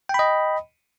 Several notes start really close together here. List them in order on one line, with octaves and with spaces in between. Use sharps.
G5 B5 D#5